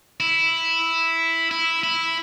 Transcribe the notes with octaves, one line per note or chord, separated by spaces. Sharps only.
E4
E4
E4